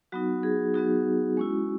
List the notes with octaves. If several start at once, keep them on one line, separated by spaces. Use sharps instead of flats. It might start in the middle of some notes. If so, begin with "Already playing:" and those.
F#3 B3 D#4 F#4
G#4
F#3 B3 D#4 F#4
G#3 C#4 E4